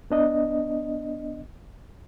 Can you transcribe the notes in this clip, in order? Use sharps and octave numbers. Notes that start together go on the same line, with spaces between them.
B3 D4 D#5